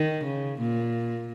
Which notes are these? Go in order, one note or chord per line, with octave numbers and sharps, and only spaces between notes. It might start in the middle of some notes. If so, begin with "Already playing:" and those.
Already playing: D#3
C#3
A#2